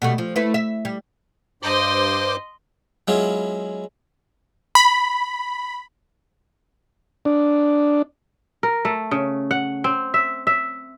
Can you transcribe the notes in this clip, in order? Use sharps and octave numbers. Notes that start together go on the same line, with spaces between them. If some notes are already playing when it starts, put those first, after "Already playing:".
B2 G3 A3
F3
A3 E4 B4
E5
G3
G2 C5 D#5 C6 D6
F#3 G#3 B3 C#4 E4 F4
B5
D4
A#4
A3
C#3
F#5
C4
E5
E5